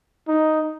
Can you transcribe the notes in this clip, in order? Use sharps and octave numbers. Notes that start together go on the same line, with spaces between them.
D#4